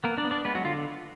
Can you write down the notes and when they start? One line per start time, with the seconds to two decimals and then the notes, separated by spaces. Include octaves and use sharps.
0.04 A#3 B3 A#4
0.17 D4 D5
0.24 B3
0.31 D4 D5
0.45 G#3 B3 B4
0.55 F#3 F#4
0.65 D3 F4